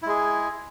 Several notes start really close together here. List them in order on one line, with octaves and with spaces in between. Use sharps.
E4 G#3 G#4